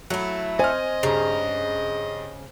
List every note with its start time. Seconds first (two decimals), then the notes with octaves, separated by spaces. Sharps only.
0.10 F#3 A3 E4
0.59 C5 D#5 G#5 F6
1.03 G2 C#3 A#5